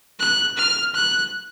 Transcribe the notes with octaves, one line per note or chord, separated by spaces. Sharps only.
F#6
F6
F#6